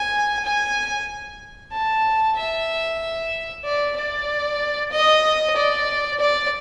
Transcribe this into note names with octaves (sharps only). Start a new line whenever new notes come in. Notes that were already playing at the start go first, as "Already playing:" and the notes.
Already playing: G#5
G#5
A5
E5
D5
D5
D#5
D5
D5